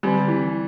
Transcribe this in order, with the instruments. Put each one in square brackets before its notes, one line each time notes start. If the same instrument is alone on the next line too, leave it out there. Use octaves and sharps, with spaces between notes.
[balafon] D3 C4 G4 [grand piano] G3
[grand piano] E3